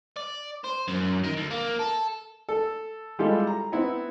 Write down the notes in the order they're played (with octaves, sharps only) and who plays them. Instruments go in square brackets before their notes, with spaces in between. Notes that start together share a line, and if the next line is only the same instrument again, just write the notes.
[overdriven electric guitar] D5
C5
F#2
D#3
D2
A#3
A4
[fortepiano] A4
G3 G#3 E4 F4 G4 A4
A#5
B3 C4 E4